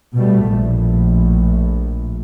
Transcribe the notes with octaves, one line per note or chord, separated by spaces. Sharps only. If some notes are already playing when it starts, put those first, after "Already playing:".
B2 G3 A3
A#1 A2